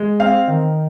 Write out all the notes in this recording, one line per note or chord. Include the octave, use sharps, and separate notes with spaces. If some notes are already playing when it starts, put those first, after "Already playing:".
Already playing: G#3
C4 F5
D#3